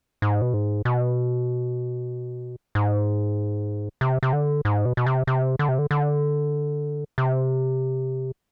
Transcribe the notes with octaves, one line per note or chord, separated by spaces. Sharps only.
G#2
B2
G#2
B2
G#2
C3
C3
D3
G#2
B2
B2
C3
C3
D3
C3
D3
D3
C3